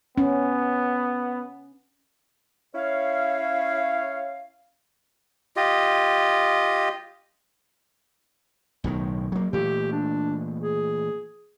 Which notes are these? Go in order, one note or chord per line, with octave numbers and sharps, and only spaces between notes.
B3 C#4
C#4 E4 C#5 F5
F4 G4 D#5
B1 A2 D#3
F#3 A#3
A#2 E3 A3 G4
D4
G#4